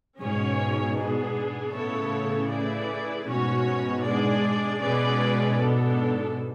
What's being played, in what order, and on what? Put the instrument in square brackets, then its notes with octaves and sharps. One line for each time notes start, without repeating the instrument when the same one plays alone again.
[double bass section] G#2 B2 [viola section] C#4 G#4 C#5
[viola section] B3 D4 G#4
[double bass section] A2 C#3 [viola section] B3 E4 A4 C#5
[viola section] A3 E4 G#4 B4 D5
[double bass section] G#2 B2 [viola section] C#4 F#4 C#5
[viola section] G#3 D4 G#4 D5
[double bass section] G#2 B2 [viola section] G#3 C#4 G#4 B4 D5
[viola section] B3 D4 A4